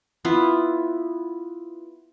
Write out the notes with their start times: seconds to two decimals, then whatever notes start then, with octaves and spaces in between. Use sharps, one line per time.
0.25 B3 E4 F4